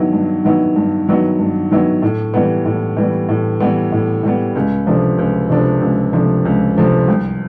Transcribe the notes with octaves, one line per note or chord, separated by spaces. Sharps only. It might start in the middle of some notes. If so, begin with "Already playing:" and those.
Already playing: G2 D#3 F#3 B3 E4
G2
D#3 F#3 B3 E4
G2
D#3 F#3 B3 E4
G2
D#3 F#3 B3 E4
A2
E3 G3 B3
A2
E3 G3 B3
A2
E3 G3 B3
A2
E3 G3 B3
C#2
C3 F3 A3 D4
C#2
C3 F3 A3 D4
C#2
C3 F3 A3 D4
C#2
C3 F3 A3 D4
C2